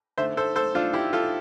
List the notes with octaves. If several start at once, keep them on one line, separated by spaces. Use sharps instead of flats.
D3 A3 C5 E5
A4 C5
A4 C5
D4 F4
E4 G4
F4 A4